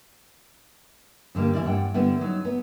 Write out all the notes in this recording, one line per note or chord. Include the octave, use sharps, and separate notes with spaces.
G2 D3 G3 A#3
E3 E4 D5
G2 F#5 G5
D3 G3 B3 E4
F#3 D#4
B3